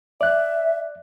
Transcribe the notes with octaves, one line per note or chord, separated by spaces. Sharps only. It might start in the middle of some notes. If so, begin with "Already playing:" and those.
D5 E5 F#6